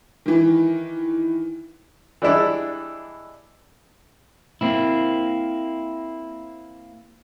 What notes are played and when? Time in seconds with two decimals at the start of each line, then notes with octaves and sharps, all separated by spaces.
0.26 D#3 E3
2.22 E3 G3 G#3 D4 E4
4.61 A#3 C4 E4